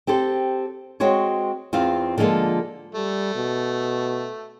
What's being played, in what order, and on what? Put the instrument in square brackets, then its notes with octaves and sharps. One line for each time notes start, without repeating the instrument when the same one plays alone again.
[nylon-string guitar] C4 G4 A4 C5
G#3 C4 F#4 C5 C#5
E2 C4 F4 F5
D3 F3 G#3 A#3 F4 A4
[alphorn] G3 [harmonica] A3
[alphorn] B2